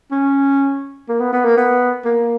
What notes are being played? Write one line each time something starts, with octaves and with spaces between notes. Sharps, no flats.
C#4
A#3
B3
B3
A#3
B3
A#3